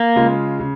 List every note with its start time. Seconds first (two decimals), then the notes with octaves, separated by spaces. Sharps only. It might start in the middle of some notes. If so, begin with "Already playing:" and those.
Already playing: A#3
0.16 C#3 G#3 F4
0.60 C#3